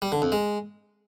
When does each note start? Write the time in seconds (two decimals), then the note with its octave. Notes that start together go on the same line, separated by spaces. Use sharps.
0.02 G3
0.12 D3
0.22 F2
0.32 G#3